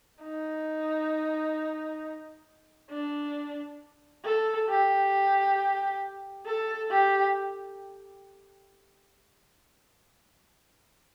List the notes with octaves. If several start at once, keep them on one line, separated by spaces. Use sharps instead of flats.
D#4
D4
A4
G4
A4
G4